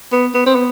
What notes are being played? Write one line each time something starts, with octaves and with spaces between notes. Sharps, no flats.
B3
B3
C4
B3